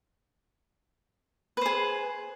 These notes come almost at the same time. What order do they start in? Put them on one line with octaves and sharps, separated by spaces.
B4 C5 G#4